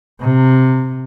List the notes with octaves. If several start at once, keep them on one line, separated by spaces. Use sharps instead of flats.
C3